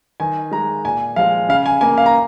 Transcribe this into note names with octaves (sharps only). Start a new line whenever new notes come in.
D#3 G#5
G#3 A#5
A#2 G#5
F3 G#3 F5
C#3 F5
G#5
A#3 G#5
F5
A#5